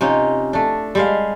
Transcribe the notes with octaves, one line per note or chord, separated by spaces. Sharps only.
C3 C#4 D#4 F4
A3 D4
G3 G#3 F5